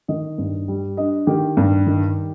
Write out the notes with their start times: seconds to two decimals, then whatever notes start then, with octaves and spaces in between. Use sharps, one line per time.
0.08 D#3 D#5
0.38 G2
0.68 G3
0.97 D4 D#5
1.27 D#3 G4
1.57 G2 G4
1.86 D#3